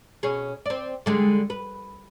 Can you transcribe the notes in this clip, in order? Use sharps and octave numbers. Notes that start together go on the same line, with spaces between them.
B2 C#4 G#4
C4 D5
D3 G3 G#3
B4